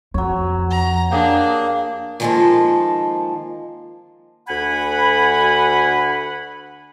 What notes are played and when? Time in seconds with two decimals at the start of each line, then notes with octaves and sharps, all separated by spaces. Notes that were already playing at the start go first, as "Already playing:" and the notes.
0.14 F2 F#3 C#5
0.70 A#5
1.11 A#3 D4 G4 G#4
2.20 D#3 F3 G#3 A#3 F4 A4
4.47 D2 F#5 G#5 B5